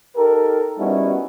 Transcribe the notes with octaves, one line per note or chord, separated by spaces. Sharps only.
D#4 G4 A4 A#4
G3 B3 C#4 D#4 E4 F#4